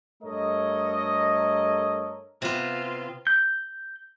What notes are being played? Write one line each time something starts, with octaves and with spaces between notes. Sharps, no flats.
G2 A3 A4 A#4 C#5 D#5
C3 B3 F4
G6